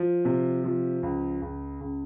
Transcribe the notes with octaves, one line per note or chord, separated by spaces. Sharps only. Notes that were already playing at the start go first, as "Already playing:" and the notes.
Already playing: F3
C3
F3
C#2
C#2
C#2